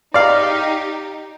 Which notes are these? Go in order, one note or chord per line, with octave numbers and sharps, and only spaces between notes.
D#4 G4 D5 F5